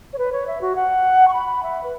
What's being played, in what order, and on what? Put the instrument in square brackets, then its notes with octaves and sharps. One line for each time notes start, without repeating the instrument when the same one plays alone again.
[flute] C#5
B4
C#5
E5
F#4
F#5
C#6
B5
E5
B4